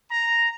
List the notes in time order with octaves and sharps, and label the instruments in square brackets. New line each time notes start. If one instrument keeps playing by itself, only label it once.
[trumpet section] A#5